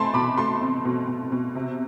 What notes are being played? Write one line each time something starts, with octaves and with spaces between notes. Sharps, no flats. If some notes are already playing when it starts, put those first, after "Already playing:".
Already playing: A3 C4 G#5 A5 B5 C6
B2 B5 D6
A3 A5 C6
C4
B2
B2
B2
C3